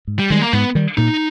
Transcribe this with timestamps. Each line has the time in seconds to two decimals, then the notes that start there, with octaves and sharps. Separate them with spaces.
0.07 G#2
0.19 G3
0.30 D#3 G3 G#3
0.42 A#3
0.53 G#2 B3
0.75 D#3 G3
0.97 A#2 D#4